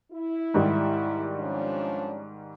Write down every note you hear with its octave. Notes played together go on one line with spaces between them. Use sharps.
E4
G#2 D#3 G3
F3 C#4 D4